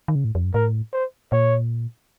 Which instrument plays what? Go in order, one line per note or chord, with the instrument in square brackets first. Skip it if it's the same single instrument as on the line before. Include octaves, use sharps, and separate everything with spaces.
[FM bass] D#3
C#3
A2
F2
F#2
[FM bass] A2 [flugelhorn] A#4
[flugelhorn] C5
[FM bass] A#2 [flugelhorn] C#5